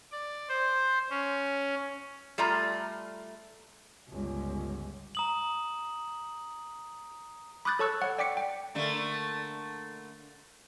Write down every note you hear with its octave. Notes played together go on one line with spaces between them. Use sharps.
D5
C5
C#4
G3 A3 F4 A#5
G1 C#2
A#5 D#6 F#7
B5 D6 D#6 F#6 G6 A6
A4 C#5 A5 C#6 E6 F#6
C#5 F#5
D5 G5 D6 B6 C#7
G5
D3 A3 A#3